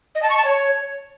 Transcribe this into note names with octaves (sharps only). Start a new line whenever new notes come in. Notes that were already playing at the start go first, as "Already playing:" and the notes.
D#5
A5
C#6
A5
C#5